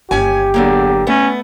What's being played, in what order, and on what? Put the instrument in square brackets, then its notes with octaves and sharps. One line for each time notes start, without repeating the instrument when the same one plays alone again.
[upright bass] G1 [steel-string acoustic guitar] D#2 C#4 G#5 [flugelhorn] G4
[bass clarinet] E2 [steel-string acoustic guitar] D3 F#3 A#3
[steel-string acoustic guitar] A3 B3 [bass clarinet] C#4